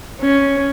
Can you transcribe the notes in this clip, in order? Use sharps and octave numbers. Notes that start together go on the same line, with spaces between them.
C#4